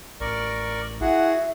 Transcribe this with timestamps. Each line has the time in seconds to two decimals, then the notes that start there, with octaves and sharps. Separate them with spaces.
0.20 A1 A#4 D5 C#6
1.01 E4 F#4 G#4 E5 F#5